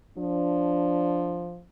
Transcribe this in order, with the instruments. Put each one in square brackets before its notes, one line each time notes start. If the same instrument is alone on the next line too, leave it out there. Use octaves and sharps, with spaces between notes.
[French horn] F3 [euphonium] D4